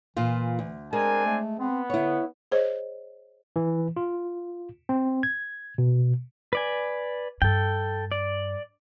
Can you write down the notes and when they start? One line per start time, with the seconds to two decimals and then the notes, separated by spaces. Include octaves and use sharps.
0.17 A#2 E3 F4
0.59 D2
0.93 G#3 C4 D4 A#4 G#5
1.26 A3
1.60 B3 C4
1.90 D3 E4 C#5
2.52 G#4 C5 C#5 D#5
3.56 E3
3.97 F4
4.89 C4
5.23 G#6
5.78 B2
6.53 B4 D5 G#5
7.42 G2 A4 G5
8.12 D5